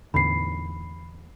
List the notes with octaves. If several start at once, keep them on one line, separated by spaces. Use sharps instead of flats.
E2 A2 D3 B5 C7